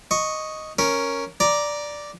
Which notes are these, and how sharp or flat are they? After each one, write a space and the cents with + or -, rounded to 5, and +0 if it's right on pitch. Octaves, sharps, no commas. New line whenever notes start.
D#5 +0 C#6 +0
C#4 +0 A#4 +0
D5 +0 A#5 +15